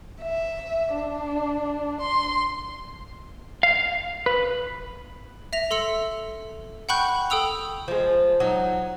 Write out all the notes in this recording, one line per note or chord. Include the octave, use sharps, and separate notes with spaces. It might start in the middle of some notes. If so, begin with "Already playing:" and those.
E5
D4
C6
F5
B4
E5 A#6 F7
A4 C6 E6 C#7
F#5 G5 B5 C#6 F#6 G6
A4 G5 D#6 E6 F7
F3 G#3
F#3 D#4